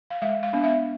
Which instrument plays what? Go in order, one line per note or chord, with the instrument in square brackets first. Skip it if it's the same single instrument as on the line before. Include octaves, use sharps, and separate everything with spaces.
[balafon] F5
G#3 E5
F5
B3 D4
E5